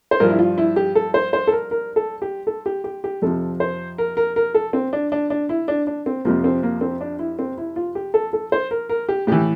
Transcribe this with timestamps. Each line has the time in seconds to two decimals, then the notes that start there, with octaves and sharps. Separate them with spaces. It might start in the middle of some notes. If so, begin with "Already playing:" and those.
0.11 C5
0.20 G2 F3 A#4
0.29 E4
0.39 F4
0.58 E4
0.76 G4
0.95 A4
1.14 C5
1.33 C5
1.47 A4
1.52 A#4
1.71 A#4
1.96 A4
2.22 G4
2.47 A4
2.66 G4
2.84 G4
3.04 G4
3.22 F2 C3 F3 A4
3.60 C5
3.98 A#4
4.17 A#4
4.36 A#4
4.54 A4
4.73 C4
4.93 D4
5.12 D4
5.30 D4
5.49 E4
5.68 D4
5.87 D4
6.06 C4
6.25 F2 C3 F3 A#3
6.44 C4
6.63 A#3
6.81 C4
7.01 D4
7.19 E4
7.39 C4
7.58 E4
7.76 F4
7.95 G4
8.14 A4
8.33 A4
8.52 C5
8.71 A#4
8.89 A#4
9.09 G4
9.27 A2 E3 G4